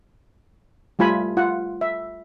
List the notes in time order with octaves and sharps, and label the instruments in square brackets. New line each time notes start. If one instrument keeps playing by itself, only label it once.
[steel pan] G3 A3 F4 G#5 B5
F4 F#5
E5